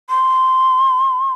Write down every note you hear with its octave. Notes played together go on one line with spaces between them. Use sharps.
C6